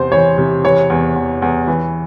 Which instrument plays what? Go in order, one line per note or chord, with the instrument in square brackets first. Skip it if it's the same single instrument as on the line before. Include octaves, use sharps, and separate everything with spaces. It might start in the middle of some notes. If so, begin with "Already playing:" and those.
Already playing: [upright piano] E2 C3 [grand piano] C5
[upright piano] E3 [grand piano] C#5
[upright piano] C3
[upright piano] E3 [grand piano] C#5
[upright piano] E2
E2
E2
E3